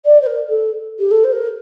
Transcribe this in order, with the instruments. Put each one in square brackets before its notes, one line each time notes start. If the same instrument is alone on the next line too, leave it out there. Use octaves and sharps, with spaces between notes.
[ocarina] D5
C5
A#4
A4
G4
A4
C5
A#4